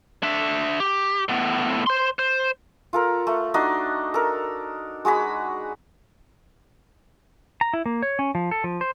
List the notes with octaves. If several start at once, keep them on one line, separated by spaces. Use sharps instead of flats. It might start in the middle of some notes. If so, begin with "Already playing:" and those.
D4 E5
G4
A2 B3
C5 C6
C5
F4 A4 A#4
A3
D4 D#4 F#4 D#5
A4 A#4
G#3 F#4 G#4 B5
A#5
E4
A#3
C#5
C#4
F3
A4
F3
C5